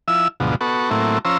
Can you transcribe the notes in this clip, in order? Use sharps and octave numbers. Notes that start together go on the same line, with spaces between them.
F3 E4 E6
D2 G#2 B2 F3 F#3
B3 F#4 A4 C#6
A2 F#3 A3 A#3 C4 E4
F3 C#4 C5 A#5 E6